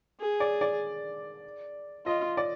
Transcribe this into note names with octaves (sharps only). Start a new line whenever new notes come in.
G#4
D5
D5
F4 D#5
D5